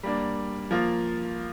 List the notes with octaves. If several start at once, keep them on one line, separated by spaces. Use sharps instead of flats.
G3 A#3 D4
F3 A#3 F4